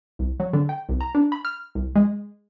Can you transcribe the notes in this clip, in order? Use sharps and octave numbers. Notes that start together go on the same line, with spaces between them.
C2
F#3
D3
G5
C2
A#5
D4
B5
F6
C2
G#3